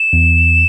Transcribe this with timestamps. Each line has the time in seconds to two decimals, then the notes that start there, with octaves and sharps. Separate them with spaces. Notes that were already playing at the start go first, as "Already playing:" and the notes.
Already playing: E7
0.13 E2